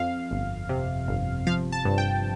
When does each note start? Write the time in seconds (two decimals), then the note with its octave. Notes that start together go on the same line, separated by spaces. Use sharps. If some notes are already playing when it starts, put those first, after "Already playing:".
Already playing: F2 F5
0.31 G1
0.69 C3
1.08 G1
1.47 F3 F5
1.72 A5
1.85 G2
1.98 G5